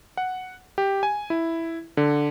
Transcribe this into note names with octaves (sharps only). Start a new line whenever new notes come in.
F#5
G4
G#5
E4
D3